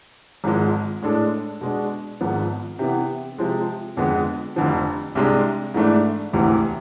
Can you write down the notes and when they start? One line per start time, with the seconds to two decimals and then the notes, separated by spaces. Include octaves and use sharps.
0.44 G#1 G#2 F3 G#3
1.02 A2 G#3 D4 A4
1.61 B2 G#3 D4
2.21 G#1 G#2 F3 B3
2.79 C3 E3 B3
3.38 C3 F3 G#3
3.97 F2 D3 G#3 B3
4.56 F1 F2 D3 F3
5.15 C2 C3 G#3 D4
5.74 G#2 E3 A3 D4
6.33 E1 D2 C3 E3